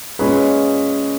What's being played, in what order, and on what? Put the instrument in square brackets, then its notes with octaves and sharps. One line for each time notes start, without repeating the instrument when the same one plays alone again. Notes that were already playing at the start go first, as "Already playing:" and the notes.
[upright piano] A#2 G#3 C#4 G#4 B4